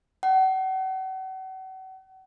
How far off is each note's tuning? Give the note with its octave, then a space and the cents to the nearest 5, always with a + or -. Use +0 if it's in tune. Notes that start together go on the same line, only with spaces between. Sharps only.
F#5 +40